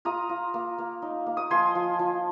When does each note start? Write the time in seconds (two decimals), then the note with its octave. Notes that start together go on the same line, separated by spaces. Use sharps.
0.05 F4 A#5 D#6
0.29 F4
0.54 A#3
0.78 A#3
1.02 D#4
1.26 A#3
1.37 D#6
1.51 F3 G#5 C6
1.75 F3
1.99 F3